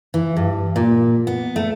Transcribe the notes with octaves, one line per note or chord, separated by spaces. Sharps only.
E3
G2
A#2
B3
A3